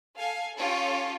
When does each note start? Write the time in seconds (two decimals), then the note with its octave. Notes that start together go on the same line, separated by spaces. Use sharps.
0.18 A4 F5 G#5
0.58 C#4 F4 G4 A4 C#5